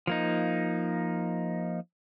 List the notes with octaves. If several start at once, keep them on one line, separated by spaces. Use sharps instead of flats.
F3 A#3 D#4